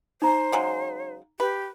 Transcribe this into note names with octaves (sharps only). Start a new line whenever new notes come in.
D#4 C5 A#5
C#3 F#3 G#3
G4 B4